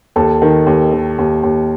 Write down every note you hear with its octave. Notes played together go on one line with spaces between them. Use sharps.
D#2 A4 A5
D#3
D#2
D#3
D#2
D#2